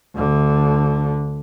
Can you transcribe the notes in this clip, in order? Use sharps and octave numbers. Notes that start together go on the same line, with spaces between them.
D2 D3